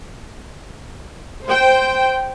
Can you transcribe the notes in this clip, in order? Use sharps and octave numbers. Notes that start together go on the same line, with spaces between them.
C5 G5